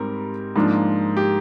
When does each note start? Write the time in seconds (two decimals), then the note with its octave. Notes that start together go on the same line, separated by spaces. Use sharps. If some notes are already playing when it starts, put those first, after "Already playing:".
Already playing: G#2 G3 C4 A#4
0.56 G#2 F3 A#3 D4
1.17 G4